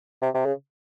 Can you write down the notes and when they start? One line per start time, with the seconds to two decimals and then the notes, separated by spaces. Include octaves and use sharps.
0.22 C3
0.34 C3
0.46 C#3